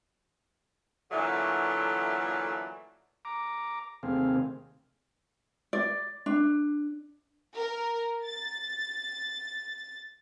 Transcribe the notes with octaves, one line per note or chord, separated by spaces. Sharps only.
A#2 D3 E3 F#3 A3
A#5 D6
D#2 C3 A3 C4 G#4 F5
D5
D4
A#4
A6